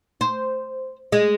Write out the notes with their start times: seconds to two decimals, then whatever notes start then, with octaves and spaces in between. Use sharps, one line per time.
0.21 C5
1.12 G#3